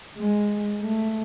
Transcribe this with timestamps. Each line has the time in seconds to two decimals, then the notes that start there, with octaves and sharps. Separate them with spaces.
0.17 G#3
0.81 A3